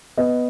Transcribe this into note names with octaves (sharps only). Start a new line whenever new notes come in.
B3 D#5